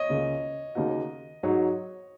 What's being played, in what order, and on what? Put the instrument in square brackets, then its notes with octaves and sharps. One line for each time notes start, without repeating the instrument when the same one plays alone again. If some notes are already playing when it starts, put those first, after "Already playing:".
Already playing: [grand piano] C#5 D#5
[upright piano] C#2 C#3 A#3
D#2 C#3 A#3 D#4 F#4
[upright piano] G#2 F#3 D#4 F#4 [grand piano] C#5